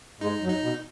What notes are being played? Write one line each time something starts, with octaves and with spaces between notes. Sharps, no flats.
G#2 G#3 D#4
F#2 F#3
D#4
B2